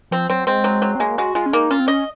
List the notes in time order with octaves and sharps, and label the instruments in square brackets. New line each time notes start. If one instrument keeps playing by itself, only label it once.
[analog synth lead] F3 [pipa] C4
[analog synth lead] F#3 [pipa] C4
[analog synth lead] G#3 [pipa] C4
[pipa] F#3
F#3
[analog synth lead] C4
[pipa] G#3 [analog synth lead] A#3
[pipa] G#3 [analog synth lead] F#4
[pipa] G#3 [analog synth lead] F4
[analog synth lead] C#4
[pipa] A#3 [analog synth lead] D#4
[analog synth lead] C#4 [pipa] F4
[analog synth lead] C4
[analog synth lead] C#4 [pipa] D#5